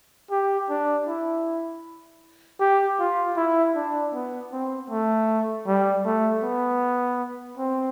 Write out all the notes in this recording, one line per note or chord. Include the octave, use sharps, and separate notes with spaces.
G4
D4
E4
G4
F4
E4
D4
B3
C4
A3
G3
A3
B3
C4